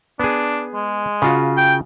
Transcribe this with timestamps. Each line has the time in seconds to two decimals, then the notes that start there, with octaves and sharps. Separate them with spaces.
0.20 B3 D4 G#4
0.74 G#3
1.22 C#3 F4 F#4
1.58 G5